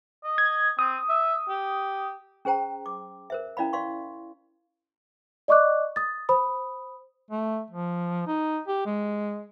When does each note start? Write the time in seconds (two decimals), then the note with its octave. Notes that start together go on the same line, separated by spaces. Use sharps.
0.24 D#5
0.38 G#6
0.79 C4 D#6
1.09 E5
1.49 G4
2.45 C#4 G#4 C5 G5 A#5
2.86 D6
3.30 A#4 C5 E5
3.57 C#4 E4 D5 F5 B5
3.73 D5 F5 C6 C#6
5.48 D5 D#5 C#6 D6 F#6
5.96 D#6 A6
6.29 C5 B5 D#6
7.30 A3
7.71 F3
8.27 D#4
8.67 G4
8.86 G#3